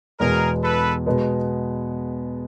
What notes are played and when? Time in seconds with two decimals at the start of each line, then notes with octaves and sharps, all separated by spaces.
0.20 E2 B2 G#3 B3 G#4 A#4
0.63 A4 B4
1.06 B2 G#3 B3